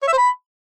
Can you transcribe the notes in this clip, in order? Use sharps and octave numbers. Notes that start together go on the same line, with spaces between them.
C#5
E5
C5
B5